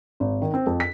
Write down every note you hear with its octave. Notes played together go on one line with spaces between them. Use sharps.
G#1
D#3
C4
F2
B6